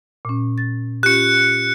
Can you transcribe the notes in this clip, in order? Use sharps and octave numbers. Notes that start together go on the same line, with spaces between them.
A#2 C#4
A6
C#4 F4 G4 F#6 C#7